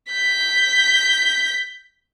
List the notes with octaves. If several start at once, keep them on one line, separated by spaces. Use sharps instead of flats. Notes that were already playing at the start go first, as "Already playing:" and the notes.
G6 B6